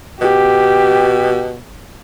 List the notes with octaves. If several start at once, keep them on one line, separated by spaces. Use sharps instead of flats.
B2 G4